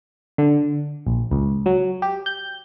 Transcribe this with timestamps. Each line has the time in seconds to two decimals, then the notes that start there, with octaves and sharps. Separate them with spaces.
0.38 D3
1.07 A#1
1.31 C#2
1.66 F#3
2.02 G4
2.26 G6